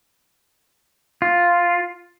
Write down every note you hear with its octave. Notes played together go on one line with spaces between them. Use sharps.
F4